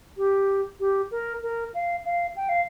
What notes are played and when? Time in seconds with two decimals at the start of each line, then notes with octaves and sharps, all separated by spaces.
0.17 G4
0.80 G4
1.11 A#4
1.43 A#4
1.74 F5
2.05 F5
2.36 G5
2.49 F5